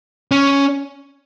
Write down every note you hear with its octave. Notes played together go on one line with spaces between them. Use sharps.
C#4